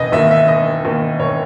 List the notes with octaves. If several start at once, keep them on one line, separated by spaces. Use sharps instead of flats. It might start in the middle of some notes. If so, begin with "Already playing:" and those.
Already playing: E1 B4 D#5
D#2 D#3 A#3 E5
E5
E1 D#5
D#2 D#3 A#3
E1 C#5